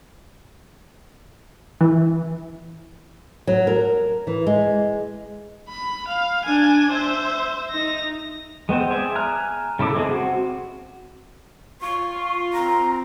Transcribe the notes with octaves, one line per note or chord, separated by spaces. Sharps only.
E3
F#3
A#4
E3
G#3
B5
F5
D4 G#5
C5 E5
D#4 A#6
G#3 B3 C4 C5
G#4 D5 E5 G#5
G#5 A#5 F6 F#6
C#3 E4 A4 D6
G#3 C4 G4 G#4
C4 F#4
F4 C#6
C4 A#5